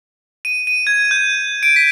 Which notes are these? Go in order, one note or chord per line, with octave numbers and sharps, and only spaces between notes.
D#7
D#7
G#6
G6
D7
B6